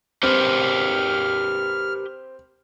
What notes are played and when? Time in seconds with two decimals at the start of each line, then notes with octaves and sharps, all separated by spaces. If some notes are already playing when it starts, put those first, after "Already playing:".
0.23 C4 G4 A#4 B4 F6